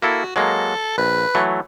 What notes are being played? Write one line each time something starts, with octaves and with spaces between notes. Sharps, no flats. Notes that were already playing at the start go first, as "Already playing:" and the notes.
A#3 E4 F#4 A4
F#3 G#3 A#3 A4
A#1 B4
E3 F#3 A3